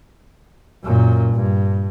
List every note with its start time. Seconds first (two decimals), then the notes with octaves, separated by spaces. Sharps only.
0.84 F#2 A#2
1.33 G2